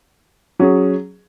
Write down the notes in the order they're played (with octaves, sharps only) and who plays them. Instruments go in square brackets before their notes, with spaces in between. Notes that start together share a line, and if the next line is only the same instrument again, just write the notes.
[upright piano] F#3 C#4 G#4